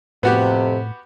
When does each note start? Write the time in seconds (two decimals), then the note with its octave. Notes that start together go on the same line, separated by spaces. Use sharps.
0.23 F2 A2 C3 B3 F#4 G4